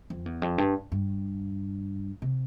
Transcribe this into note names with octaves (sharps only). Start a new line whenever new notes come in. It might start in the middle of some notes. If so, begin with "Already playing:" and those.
F2
E2
F2
G2
G2
C3